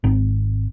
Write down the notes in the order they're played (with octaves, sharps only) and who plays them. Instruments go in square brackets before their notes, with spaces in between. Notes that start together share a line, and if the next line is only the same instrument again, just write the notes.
[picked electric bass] G#1